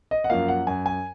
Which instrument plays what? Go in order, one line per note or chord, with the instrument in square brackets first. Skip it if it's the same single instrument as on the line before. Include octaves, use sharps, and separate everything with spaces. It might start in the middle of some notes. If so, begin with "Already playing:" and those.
[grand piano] D#5
F#5
F#2 F3 A#3 F5
F#5
F#2 G#5
G#5